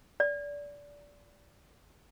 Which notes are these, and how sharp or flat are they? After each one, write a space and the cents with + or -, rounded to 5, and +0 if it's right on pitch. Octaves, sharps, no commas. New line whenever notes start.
D5 -20